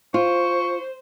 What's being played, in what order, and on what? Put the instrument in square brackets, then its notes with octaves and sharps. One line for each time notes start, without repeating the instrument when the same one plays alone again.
[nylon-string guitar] F4 [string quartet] C5 [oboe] C#6